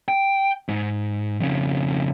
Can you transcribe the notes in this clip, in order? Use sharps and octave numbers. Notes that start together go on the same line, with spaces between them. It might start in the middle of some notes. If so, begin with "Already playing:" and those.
G5
G#2
F2 C#3